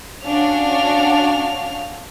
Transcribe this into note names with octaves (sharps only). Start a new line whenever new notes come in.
C#4 D4 F#4 F5 F7